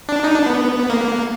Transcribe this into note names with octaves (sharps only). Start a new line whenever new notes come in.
D4
D#4
D4
B3
A#3